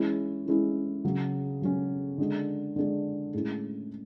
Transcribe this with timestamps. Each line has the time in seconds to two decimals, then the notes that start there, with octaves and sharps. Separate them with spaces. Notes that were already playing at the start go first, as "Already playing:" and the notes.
Already playing: E3 G#3 C#4 E4
0.46 E3 G#3 C#4 E4
1.04 C#3 F#3 C#4
1.62 C#3 F#3 C#4
2.18 D3 G#3 D4
2.76 D3 G#3 D4
3.34 A2 G#3 C#4 E4